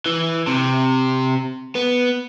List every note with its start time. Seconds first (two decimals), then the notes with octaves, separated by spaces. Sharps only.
0.06 E3
0.47 C3
1.75 B3